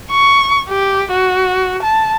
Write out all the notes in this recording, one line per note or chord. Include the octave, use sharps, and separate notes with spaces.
C#6
G4
F#4
A5